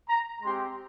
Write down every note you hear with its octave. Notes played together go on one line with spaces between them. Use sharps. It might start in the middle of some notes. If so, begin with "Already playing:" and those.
A#5
G#3 C4 G4 C6